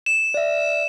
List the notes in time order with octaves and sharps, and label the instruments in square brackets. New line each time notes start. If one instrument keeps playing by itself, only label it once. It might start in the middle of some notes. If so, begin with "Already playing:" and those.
[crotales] E7
[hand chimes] D5 E5